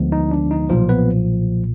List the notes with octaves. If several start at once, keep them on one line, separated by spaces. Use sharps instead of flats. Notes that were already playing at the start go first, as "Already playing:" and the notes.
Already playing: D2 D3 F3 G#3 B3
D#4
D4
D#4
B1 A#2 F3 F4
B3 B4